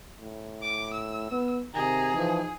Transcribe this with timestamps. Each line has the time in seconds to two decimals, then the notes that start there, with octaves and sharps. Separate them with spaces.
0.20 A2
0.62 D6
0.93 E6
1.31 B3
1.74 C3 D#3 G#4 A#5
2.14 E3 F3 D#4